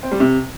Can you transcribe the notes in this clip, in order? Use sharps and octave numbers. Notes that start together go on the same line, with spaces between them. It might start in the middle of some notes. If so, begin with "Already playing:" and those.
C4
G3
C3